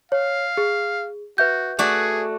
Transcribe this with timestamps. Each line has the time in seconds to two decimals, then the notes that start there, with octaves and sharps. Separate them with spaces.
0.12 C#5 F5
0.57 G#4
1.38 F#4 B4 E5 G6
1.79 A3 F#4 G#4 D5